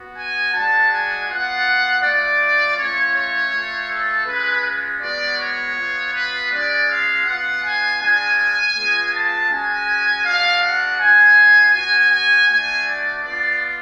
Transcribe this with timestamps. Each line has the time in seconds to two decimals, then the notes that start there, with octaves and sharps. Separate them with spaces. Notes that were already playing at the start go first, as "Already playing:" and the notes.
Already playing: B3 F#4
0.16 G#5
0.53 G#3 D4 F#4 A5
0.91 G#5
1.28 B3 F4 F#5
2.03 A3 F4 D5
2.77 A3 C#4 F4 C#5
3.15 C#5
3.52 A3 F4
3.90 A4
4.27 G#3 C#4 F4 B4
5.01 G#3 B3 F#4 D5
5.38 C#5
5.76 B3 F4
6.14 B4
6.51 G#3 C#4 F4 D5
6.88 F5
7.25 B3 F4 F#5
7.63 G#5
8.01 G#3 D4 F4 G#5
8.75 G#3 B3 F4
9.13 A5
9.49 G#3 C#4 F#4 G#5
10.24 G#3 D4 F#4 F5
10.62 F#5
10.99 B3 F4 G#5
11.74 B3 F#4 G#5
12.11 G#5
12.48 A3 D4 F#4 G#5
12.85 D5
13.23 B3 F4 D5